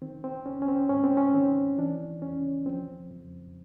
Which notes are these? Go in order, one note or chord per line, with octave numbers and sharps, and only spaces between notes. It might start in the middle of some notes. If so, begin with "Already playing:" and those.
D#3 C4
C4
C#2 C#4
C#4
C4
G#2 C#4
C4
C#4
D#3 C4
E3 D4
E2 C#4
F3 C4
F2